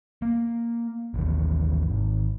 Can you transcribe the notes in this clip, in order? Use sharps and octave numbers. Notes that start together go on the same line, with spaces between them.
A#3
A1 D#2
G#1